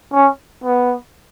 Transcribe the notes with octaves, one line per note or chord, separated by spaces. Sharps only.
C#4
B3